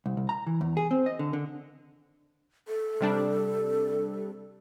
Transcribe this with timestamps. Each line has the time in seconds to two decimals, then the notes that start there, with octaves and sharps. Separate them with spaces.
0.06 C2
0.17 C2
0.29 A#5
0.47 E3
0.61 E2
0.77 G#4
0.91 C4
1.06 D#5
1.19 D3
1.33 D3
2.68 A4
3.01 C3 G3 D4